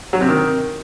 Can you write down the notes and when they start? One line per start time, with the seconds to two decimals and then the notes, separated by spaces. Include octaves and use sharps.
0.13 F#3
0.21 C3
0.29 D#3